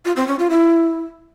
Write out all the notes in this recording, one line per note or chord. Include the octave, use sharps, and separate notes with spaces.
F4
C4
C#4
F4
E4